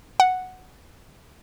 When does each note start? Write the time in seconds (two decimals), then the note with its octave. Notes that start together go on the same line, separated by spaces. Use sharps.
0.20 F#5